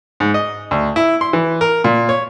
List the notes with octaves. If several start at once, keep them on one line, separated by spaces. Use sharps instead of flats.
G#2
D#5
D2
E4
C6
E3
A#4
A#2
C#5